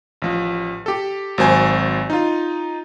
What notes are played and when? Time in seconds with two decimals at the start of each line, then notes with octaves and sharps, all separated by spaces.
0.22 A1 F3
0.86 G4 A4
1.38 G#1 F#3 C5 G#5
2.10 D#4 F4